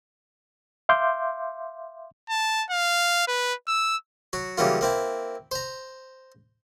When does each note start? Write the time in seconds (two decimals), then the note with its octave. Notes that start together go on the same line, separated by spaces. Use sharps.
0.89 E5 F5 C6 D6 G6
2.30 A5
2.71 F5
3.28 B4
3.68 E6
4.33 F#3 F#4
4.58 C#3 E3 F#3 G3 A#3 F4
4.81 A#3 C4 E4
5.51 C5 A#5